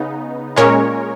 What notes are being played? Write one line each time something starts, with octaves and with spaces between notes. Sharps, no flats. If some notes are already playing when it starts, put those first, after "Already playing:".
Already playing: C#3 B3 D#4
A#2 G#3 C#4 A#4 C#5